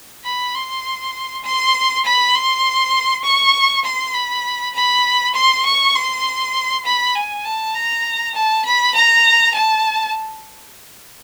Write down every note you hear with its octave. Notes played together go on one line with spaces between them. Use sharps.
B5
C6
C6
B5
C6
C#6
C6
B5
B5
C6
C#6
C6
B5
G#5
A5
A#5
A5
B5
A#5
A5